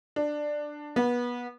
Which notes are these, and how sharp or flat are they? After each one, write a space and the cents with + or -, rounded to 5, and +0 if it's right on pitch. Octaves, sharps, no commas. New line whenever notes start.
D4 +10
B3 -25